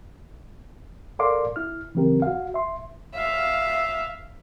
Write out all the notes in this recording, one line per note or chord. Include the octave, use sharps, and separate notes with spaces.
A4 A#4 D5 F5 C6 D6
E4 F6
C#3 E3 F#3 C4 G4 A#4
F#4 F5
E5 C6
E5 F5